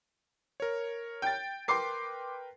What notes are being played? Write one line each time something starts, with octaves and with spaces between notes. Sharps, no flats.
A#4 C#5
G5 A6
A#4 B4 G5 C6 D6 C7